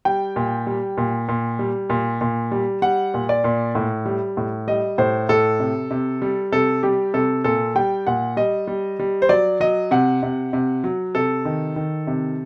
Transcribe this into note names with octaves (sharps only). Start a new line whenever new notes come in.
G3 G5
A#2
G3
A#2
A#2
G3
A#2
A#2
G3
G3 F#5
A#2
D5
A#2
A2
G3
A2
G3 D#5
A2 C5
A2 A4
C3
C3
G3
C3 A4
G3 G4
C3 A4
A#2 A4
G3 G5
A#2 F#5
G3 D#5
G3
G3
C5
F#3 D5
F#3 D#5
C3 F#5
C3
C3
F#3
C3 A4
D#3
D#3
C3